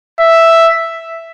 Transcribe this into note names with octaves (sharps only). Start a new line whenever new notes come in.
E5